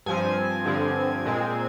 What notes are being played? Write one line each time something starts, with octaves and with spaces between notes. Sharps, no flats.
G2 F3 C4 G#5
G2 D3 F3 C4
A#2 G#3 C4